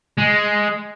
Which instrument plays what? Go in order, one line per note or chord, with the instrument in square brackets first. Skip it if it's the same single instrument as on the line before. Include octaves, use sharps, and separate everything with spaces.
[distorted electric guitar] G#3